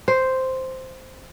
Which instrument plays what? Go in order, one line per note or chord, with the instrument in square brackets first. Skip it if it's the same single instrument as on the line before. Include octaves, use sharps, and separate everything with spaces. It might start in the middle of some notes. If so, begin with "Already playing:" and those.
[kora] C5